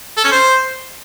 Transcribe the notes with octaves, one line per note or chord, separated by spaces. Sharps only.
A4
C#4
C5